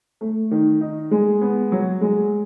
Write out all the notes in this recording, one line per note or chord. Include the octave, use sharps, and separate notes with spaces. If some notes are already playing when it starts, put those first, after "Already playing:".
A3
D#3
D#4
G#3
B3
F#3
G#3